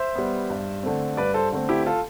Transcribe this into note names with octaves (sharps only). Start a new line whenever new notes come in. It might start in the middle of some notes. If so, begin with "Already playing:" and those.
Already playing: C5 E5
G3 B3
G2
D3 A3 C4
G2 B4 D5
A4 C5
D3 A3 C4
E4 G4
F4 A4